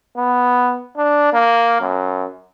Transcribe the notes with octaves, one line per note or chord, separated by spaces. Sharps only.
B3
D4
A#3
F#2